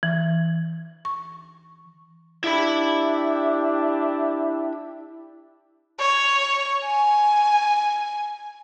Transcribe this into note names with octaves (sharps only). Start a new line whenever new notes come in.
E3
C#6
D4 E4 G4 E5 B5
C#5
G#5